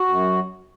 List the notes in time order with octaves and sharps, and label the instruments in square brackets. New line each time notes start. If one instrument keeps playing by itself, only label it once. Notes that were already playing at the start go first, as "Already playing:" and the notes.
Already playing: [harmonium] F#4
F#2